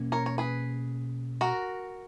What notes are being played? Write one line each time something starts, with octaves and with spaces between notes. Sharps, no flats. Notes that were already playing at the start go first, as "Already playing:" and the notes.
Already playing: B2 A#3 C#4
A#4 C#5
C#5
G#4 B4
F#4 A#4